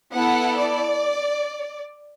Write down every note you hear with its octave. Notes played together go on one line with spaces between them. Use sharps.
B3 E4 A4 F#5
D5